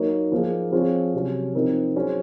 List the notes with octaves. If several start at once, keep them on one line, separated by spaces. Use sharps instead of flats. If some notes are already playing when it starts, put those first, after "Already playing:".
Already playing: F#3 A#3 D#4 A#4 C#5
F3 A#3 D#4 G#4
F3 C4 F4 G#4 C#5
C3 F#3 C#4
F3 C4 D#4 A#4
F#3 C#4 G#4 C5